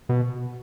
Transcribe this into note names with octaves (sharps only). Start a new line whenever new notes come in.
B2